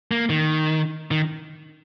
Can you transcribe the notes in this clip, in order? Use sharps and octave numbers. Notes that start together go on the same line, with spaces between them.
A#3
D#3
D#3